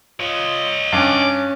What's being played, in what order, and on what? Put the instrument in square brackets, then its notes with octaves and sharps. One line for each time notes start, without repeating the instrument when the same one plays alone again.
[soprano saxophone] F4 [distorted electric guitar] C#5 D#5
[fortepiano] G2 [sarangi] C#4 [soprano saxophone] D6